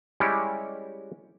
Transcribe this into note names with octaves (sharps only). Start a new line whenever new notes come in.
G3 G#3 C#4 E4 G4